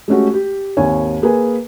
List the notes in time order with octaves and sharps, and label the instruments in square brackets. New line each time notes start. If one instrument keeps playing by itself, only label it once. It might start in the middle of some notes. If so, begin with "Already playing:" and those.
[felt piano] G#3 A3 C#4 F#4 G4
G4
G#1 D#2 C#5 G#5
A#3 G#4 B4 G#5